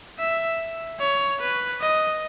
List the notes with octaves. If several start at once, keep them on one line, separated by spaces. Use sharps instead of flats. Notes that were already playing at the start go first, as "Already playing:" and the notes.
E5
C#5
B4
D#5